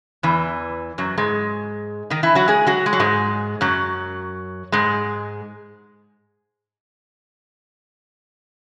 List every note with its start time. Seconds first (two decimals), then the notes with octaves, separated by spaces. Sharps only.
0.23 E2 E3
0.98 F#2 F#3
1.17 G#2 G#3
2.10 D#3 D#4
2.23 E3 E4
2.35 F#3 F#4
2.48 G#3 G#4
2.67 F#3 F#4
2.86 G#3
2.93 F#3
3.00 G#2 G#3
3.61 F#2 F#3
4.72 G#2 G#3